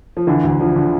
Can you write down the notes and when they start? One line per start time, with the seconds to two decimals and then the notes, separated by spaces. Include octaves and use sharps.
0.17 F3
0.27 D3 E3
0.44 D2
0.59 D3 F3
0.76 D3